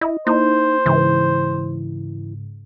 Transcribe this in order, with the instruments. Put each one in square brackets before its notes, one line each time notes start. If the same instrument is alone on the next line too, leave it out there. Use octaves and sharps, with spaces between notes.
[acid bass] E4 [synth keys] D#5
[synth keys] A#3 E4 [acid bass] D#4 [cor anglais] C5
[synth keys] G#2 C#3 [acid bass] E3